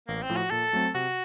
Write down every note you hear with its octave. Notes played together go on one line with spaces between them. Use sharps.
A1 A#3
C4
A2 F3
F#4
A#2 A4
F#3 A3 C4
C3 F#4